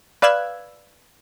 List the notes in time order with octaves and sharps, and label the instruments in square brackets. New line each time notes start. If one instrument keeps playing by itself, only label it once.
[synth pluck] B4 D5 F5 E6 F#6 G#6